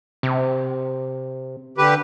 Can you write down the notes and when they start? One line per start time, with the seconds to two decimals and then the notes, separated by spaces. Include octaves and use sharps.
0.23 C3
1.78 D3 G4 B4